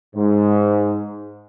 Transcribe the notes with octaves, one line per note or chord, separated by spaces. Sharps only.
G#2